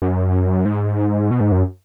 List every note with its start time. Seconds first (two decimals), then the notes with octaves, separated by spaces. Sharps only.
0.02 F#2
0.65 G#2
1.31 B2
1.41 G#2
1.52 F#2